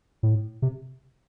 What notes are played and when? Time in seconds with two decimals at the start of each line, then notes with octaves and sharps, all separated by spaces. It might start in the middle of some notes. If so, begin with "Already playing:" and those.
0.23 A2
0.62 C3